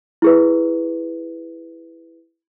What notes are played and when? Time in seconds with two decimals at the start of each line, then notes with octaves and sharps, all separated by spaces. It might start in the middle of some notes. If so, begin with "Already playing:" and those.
0.22 E4 G#4 B4